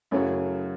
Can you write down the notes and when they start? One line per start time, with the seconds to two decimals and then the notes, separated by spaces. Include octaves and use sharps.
0.11 F#2 C#3 F#3 A3 C#4 E4